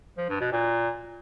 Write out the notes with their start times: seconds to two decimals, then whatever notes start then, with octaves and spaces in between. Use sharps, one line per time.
0.17 F3
0.29 G2
0.41 B2
0.52 A#2